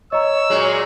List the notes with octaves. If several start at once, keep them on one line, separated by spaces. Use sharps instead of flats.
C#5 D#5 A#5 E6
A#2 F#3 G#3 C#5